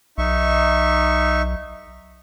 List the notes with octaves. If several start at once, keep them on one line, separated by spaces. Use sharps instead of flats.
B1 D#4 E5 C#6